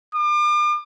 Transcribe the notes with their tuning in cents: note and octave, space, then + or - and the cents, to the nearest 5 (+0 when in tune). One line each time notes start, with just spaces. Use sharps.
D6 +40